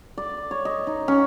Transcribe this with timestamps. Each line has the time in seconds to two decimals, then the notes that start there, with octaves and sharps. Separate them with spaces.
0.18 D5
0.51 C#5
0.65 D#5
0.87 D#4
1.08 C#4